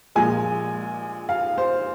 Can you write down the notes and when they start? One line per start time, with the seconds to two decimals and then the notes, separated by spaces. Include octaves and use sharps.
0.15 A#1 A#2 G#3 G#5
1.29 F5
1.58 C5